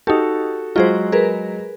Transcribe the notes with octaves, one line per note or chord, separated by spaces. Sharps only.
D#4 F#4 G4 A4
F#3 G#3 F4 F#4 G#4 C5
G#4 A#4 B4